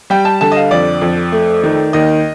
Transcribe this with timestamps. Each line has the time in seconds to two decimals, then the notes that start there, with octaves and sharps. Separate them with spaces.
0.10 G3 G5
0.25 A5
0.41 D3 A5
0.52 D#5
0.56 F5
0.71 F2 D5
1.01 F2
1.32 A3
1.63 D#3
1.93 D#2 D#5